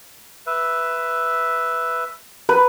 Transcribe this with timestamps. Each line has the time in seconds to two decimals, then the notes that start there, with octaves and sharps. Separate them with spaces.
0.47 B4 E5
2.49 B4